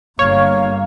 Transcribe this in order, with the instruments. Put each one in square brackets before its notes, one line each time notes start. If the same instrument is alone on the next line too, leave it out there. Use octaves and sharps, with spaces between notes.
[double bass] G1 [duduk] A#3 [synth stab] C#5 [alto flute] F5